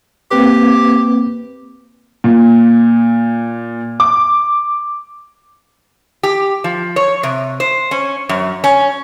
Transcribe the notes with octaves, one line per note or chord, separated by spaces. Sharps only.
A#3 C4 G4 B4
A#2
D6
G4
F3
C#5
C3
C5
C#4
F#2
C#4